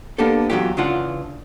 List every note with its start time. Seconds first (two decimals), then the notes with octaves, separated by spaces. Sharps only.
0.18 A#3 B3 D4 G4 A4
0.50 E2 D#3 F#3 F4 G4
0.77 C#3 E3 D4 F4 F#5